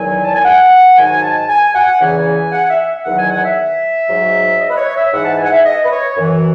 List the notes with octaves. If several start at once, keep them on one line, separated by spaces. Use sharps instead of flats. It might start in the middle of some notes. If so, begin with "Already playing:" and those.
Already playing: E2 D#3 F#3 G#5
A5
G#5
F#5
G#2 D#3 F#3 G#5
A5
G#5
F#5
E2 C#3 E3 G#5
F#5
E5
E2 D#3 F#3 F#5
G#5
F#5
E5
G#2 F#3
D#5
B4
C#5
E5
G#2 E3 F#5
A5
G#5
F#5
E5
D#5
B4
C#5
F#2 E3